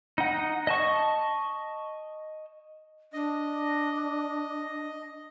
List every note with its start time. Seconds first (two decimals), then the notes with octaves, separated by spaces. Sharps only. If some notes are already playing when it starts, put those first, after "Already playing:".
0.18 D#4 F#5
0.67 D#5 A5 C#6
3.13 D4 D#5